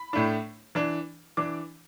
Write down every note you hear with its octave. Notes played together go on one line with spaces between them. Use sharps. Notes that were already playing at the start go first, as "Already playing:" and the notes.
Already playing: B5
A2 A3 D4
E3 D4
E3 D4 D6